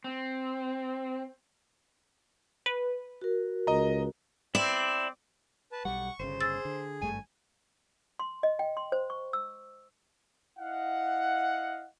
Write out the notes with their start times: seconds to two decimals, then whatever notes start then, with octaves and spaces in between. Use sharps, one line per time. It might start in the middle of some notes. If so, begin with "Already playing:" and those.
0.04 C4
2.66 B4
3.21 F#4 A#4
3.67 C#2 D#5 A#5
4.55 C4 E4 D5
5.72 B4 A5
5.85 B1 G3 F#5 C#6
6.19 G1 C#3 C5
6.41 G#4 E6 A6
6.65 D3
7.01 G#1 G2 A3 G#5
8.19 C6
8.43 D#5
8.59 G5
8.77 C6
8.92 C5
9.10 C#6
9.33 E6
10.59 E4 D#5 F5 F#5